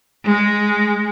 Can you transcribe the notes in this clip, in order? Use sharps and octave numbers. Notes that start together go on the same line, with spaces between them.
G#3